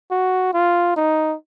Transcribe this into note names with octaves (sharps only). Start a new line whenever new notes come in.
F#4
F4
D#4